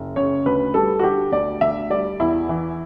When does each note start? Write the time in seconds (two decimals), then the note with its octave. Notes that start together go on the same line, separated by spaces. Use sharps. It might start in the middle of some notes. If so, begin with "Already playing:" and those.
Already playing: F#1
0.16 C#3 C#5
0.46 D2 B4
0.74 G3 A4
0.99 F#4
1.04 D3 G4
1.32 D2 D5
1.61 D2 E5
1.90 G3 D5
2.20 E2 E4
2.49 E3